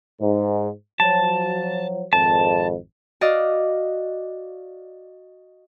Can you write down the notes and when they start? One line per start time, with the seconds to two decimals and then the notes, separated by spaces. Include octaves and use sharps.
0.20 G#2
1.00 F3 F#3 A5
2.13 G#1 F2 A5
3.21 F#4 D5 D#5 F5